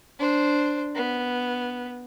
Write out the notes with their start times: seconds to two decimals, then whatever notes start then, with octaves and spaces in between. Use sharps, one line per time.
0.19 D4 C5
0.95 B3